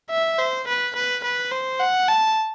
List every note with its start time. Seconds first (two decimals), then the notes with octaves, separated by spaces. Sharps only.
0.10 E5
0.39 C5
0.67 B4
0.96 B4
1.24 B4
1.52 C5
1.80 F#5
2.09 A5